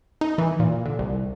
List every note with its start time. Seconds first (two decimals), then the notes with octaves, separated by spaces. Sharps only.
0.21 D#4
0.38 E3
0.60 A#2
0.85 D3
0.99 C2